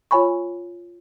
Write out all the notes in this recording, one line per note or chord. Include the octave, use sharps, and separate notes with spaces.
F4 C#5 G#5 B5 C#6